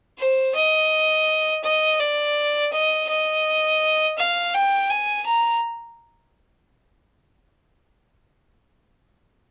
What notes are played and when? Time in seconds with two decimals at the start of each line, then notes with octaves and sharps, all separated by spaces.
0.18 C5
0.55 D#5
1.64 D#5
2.00 D5
2.73 D#5
3.09 D#5
4.18 F5
4.54 G5
4.90 G#5
5.26 A#5